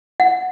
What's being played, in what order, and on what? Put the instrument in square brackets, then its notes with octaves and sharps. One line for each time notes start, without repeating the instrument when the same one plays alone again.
[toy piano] F#5